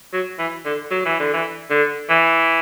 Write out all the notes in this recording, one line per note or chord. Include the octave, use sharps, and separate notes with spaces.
F#3
E3
D3
F#3
E3
D3
E3
D3
E3